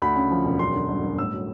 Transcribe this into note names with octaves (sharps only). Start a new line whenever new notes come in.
D2 B5
C#3
F3
E1
F#2 C6
D3
G1
G1
A2 E6
F#3